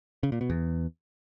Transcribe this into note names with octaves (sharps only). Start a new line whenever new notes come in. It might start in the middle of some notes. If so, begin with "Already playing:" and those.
C#3
A#2
B2
E2